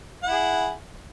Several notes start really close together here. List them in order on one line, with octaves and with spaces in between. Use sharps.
F#5 E4 G#4